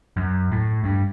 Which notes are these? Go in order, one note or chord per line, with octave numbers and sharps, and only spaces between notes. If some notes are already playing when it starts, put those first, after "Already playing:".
F#2
A2
G2